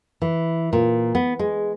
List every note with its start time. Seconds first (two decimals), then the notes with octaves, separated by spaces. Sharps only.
0.22 E3
0.73 A#2
1.15 B3
1.39 G#3